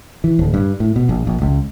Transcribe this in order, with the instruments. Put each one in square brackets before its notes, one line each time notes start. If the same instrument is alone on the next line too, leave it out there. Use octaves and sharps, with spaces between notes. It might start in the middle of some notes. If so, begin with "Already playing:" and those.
[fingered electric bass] E3
D1
G2
A2
B2
A#1
A#1
C#2